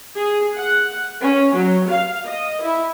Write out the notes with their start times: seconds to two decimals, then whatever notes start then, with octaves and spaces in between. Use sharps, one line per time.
0.17 G#4
0.57 F#5
1.22 C#4
1.58 F#3
1.89 F5
2.26 D#5
2.61 E4